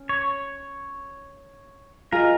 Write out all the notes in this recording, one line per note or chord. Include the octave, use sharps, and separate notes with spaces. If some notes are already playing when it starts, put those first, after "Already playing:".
Already playing: C#4
C#5
F4 G#4 A#4 D#5